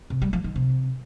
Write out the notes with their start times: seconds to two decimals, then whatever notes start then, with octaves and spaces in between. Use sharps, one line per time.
0.10 C3
0.22 G3
0.33 F3
0.44 D#3
0.56 C3